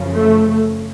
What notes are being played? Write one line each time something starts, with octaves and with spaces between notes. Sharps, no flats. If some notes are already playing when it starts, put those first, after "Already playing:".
Already playing: F#2 C#3 F3
A3